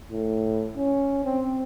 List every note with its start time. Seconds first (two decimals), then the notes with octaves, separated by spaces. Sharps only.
0.10 A2
0.76 C#4
1.24 C4